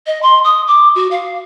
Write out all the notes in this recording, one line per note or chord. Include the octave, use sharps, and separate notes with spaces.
D#5
C6
D#6
D6
F#4
F5